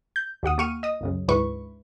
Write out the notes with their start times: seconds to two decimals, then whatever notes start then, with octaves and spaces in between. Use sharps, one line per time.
0.16 G6
0.43 D#2 G4 F#5 D#6
0.58 A#3 G4 C#6 F6 D#7
0.83 D#5 D#6
1.01 C2 F#2 C#3
1.28 D2 G#2 D3 E4 B4 C#6